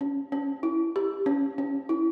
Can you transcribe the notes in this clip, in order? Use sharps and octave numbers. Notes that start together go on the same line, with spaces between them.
C#4
C#4
E4
G4
C#4
C#4
E4